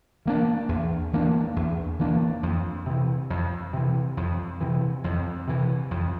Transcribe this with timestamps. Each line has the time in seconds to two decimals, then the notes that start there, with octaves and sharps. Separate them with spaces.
0.26 E3 A#3 D4
0.69 E2
1.13 E3 A#3 D4
1.56 E2
1.99 E3 A#3 D4
2.43 F2
2.86 C3 E3
3.30 F2
3.73 C3 E3
4.17 F2
4.61 C3 E3
5.04 F2
5.48 C3 E3
5.91 F2